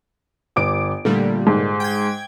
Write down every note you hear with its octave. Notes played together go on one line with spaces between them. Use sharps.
G1 D6 D7
A#2 D3 G3 A3
G#2
G5 G#6